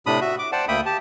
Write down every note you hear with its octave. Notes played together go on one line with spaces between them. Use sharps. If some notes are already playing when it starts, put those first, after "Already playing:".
A2 C3 D4 B5 D#6
F#4 E5
D6
C5 D5 F#5 G5 A5
D2 A#3 E5 G5 B5 D#6
G4 A5